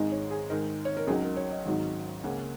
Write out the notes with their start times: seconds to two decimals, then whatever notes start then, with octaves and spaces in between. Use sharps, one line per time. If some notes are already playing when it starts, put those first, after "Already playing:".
Already playing: G#1 G#2 D#3 G#3 D#4
0.12 C#5
0.31 G#4
0.50 G#2 D#3 G#3 D#4 A#4
0.85 C#5
0.97 A#4
1.07 C#2 C#3 F#3 D#4 G#4
1.22 A#4
1.36 C#5
1.51 D#5
1.66 G#1 G#2 F#3 D#4
2.23 C#2 C#3 A#3 C#4 F#5